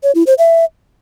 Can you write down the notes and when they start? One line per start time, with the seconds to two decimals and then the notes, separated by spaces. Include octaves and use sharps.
0.03 C#5
0.15 E4
0.27 C5
0.38 E5